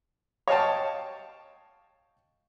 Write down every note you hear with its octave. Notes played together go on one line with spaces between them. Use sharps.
C#5 D#5 F5 G5 A5